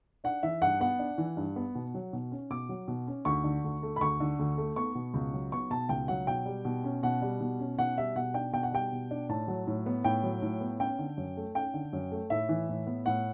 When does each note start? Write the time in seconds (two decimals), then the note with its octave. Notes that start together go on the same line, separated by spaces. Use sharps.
0.24 D4 F#5
0.43 E3 E5
0.62 G2 F#5
0.80 B3 F#5
0.99 D4
1.18 E3
1.37 G2
1.56 B3
1.75 B2
1.94 F#3
2.13 B2
2.32 C#4
2.50 B2 D6
2.69 F#3
2.88 B2
3.08 C#4
3.25 D2 C#6
3.44 D3
3.64 D2
3.83 A3
3.96 B5
4.01 D2 C#6
4.20 D3
4.39 D2
4.58 A3
4.76 B3 C#6
4.95 B2
5.14 C#2
5.33 F#3
5.52 B3 C#6
5.70 B2 A5
5.89 C#2 G5
6.08 F#3 F#5
6.27 B2 G5
6.46 G3
6.65 B2
6.84 C#4
7.03 B2 F#5
7.22 G3
7.40 B2
7.60 C#4
7.78 B2 F#5
7.97 G3 E5
8.15 B2 F#5
8.34 D4 G5
8.53 B2 G5
8.63 F#5
8.72 G3 G5
8.92 B2
9.11 D4
9.29 A2 A5
9.48 F#3
9.67 A2
9.86 B3
10.04 A2 G5
10.23 F#3
10.42 A2
10.61 B3
10.80 C#4 G5
10.99 D3
11.17 F#2
11.37 A3
11.55 C#4 G5
11.74 D3
11.93 F#2
12.12 A3
12.30 A2 E5
12.49 E3
12.69 A2
12.87 B3
13.06 A2 F#5